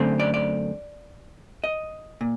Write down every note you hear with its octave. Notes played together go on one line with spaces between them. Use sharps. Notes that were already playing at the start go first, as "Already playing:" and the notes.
Already playing: F#2 D3 A3 C4
D5
D5
D#5
A#2